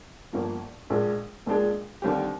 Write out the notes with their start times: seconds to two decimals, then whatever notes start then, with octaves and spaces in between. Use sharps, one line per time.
0.33 G1 G2 F3 A#3
0.90 A#1 A#2 G#3 D4 G#4
1.46 A#1 A#2 G#3 D4 G#4
2.02 D#2 D3 G3 C4 G4